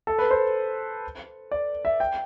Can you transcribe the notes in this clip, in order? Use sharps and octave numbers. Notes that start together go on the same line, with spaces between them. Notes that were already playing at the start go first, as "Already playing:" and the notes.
A4
B4
C5
D5
E5
G5